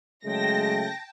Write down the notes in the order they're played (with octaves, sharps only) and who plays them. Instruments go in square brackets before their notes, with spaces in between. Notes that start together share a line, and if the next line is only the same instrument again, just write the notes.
[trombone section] C#3 F#3 A3 [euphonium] G#3 [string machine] G5 A5 [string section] A#6